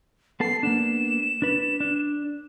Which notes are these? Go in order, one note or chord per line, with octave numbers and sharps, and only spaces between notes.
B3 A4 A5 C7
A#3 B3 D4 E7
D4 B4
D4